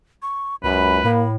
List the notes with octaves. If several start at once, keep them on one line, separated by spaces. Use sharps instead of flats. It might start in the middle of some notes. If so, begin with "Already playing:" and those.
C#6
C#2 F#2 B4 B5
A2 A#3 B5